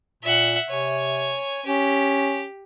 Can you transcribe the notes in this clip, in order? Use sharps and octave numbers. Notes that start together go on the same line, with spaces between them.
A#2 E5 F#5
C3 C#5 G#5
C#4 G4